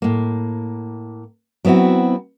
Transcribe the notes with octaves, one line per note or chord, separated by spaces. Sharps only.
A2 A#3
F#3 B3 C4 E4 F#4